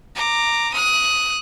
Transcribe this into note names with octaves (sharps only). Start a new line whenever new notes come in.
A#5 D6
D#6 F#6